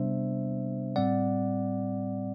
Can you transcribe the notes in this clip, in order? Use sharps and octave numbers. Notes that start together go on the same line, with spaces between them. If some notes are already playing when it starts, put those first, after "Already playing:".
Already playing: C3 G3 B3 D4 C5 E5
A2 G3 C4 D5 F#5